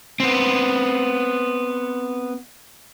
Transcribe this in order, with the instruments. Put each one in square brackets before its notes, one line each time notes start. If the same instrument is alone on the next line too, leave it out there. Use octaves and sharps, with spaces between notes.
[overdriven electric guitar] B3 C4